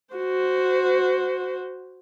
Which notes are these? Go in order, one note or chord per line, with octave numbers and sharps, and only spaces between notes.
F#4 C5